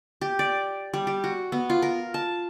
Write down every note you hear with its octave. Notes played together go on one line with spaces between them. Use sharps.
G4
D5
G3
G4
F#4
B3
F4
A#4
A5